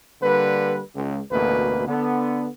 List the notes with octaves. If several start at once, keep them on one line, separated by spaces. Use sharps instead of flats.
D3 G3 A#3 B4
C#2
A1 D2 B2 A#3 B4
D3 B3